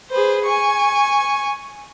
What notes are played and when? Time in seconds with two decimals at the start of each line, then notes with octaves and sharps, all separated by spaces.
0.10 G#4 B4 C5
0.44 G#5 C#6